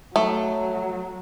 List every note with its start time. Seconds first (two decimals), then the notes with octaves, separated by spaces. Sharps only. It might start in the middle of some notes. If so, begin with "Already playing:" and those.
0.16 F#3 A3